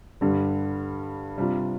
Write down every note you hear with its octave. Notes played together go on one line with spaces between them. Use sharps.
G2 D3 G3
C3 G3 D4 F4